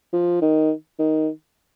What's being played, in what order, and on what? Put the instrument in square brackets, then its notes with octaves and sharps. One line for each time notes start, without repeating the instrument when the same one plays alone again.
[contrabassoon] F3
D#3
D#3